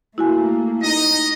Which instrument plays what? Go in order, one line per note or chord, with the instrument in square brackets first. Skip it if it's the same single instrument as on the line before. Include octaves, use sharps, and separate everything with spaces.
[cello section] A3 A#3 [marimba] E4 F#4 G#5
[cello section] D#4 [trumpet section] D#5